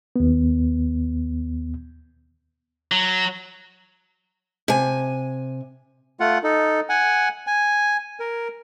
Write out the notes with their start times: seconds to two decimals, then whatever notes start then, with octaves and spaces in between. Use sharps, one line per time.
0.16 D#2 B3
2.92 F#3
4.68 C3 G#5
6.20 A3 F4 F#5
6.43 D#4 A4
6.89 F#5 G#5
7.47 G#5
8.20 A#4